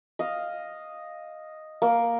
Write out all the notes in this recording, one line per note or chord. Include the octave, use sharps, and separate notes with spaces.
D#5 F5
A#3